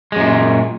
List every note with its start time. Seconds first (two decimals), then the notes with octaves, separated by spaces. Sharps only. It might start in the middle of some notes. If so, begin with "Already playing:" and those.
0.12 G#3
0.16 F#2
0.20 A#2